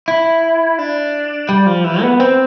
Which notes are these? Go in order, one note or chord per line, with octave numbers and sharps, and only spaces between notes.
E4
D4
G3
F3
E3
B3
C4